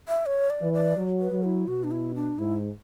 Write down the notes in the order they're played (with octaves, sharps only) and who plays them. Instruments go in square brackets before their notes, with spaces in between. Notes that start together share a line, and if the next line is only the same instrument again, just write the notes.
[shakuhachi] E5
C#5
D5
[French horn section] E3
[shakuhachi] D5
[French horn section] F#3
[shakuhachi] B4
[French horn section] F#3
[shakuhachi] E4
[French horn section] B2 [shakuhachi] F#4
[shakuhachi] D4
E4
D4
[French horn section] G#2 [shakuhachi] E4